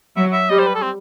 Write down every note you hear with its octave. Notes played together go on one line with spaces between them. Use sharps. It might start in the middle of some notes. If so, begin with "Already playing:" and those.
F#3 E5
E5
G3 D#5
C5
B4
A4
C4